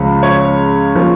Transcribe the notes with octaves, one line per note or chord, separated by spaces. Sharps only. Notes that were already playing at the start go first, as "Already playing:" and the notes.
Already playing: C#2 C#3 F3 G#3
C#5
F3 A#3